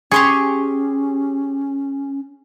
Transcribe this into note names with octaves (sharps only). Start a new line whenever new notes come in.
C#4 G4 G#4 C6 C#6